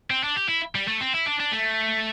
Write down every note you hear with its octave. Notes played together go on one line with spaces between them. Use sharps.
C4
D4
G4
E4
G3
A3
C4
E4
D4
D4
A3